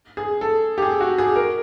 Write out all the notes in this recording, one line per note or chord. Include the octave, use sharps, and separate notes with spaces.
G#4
A4
G4
G#4
F#4
G#4
A#4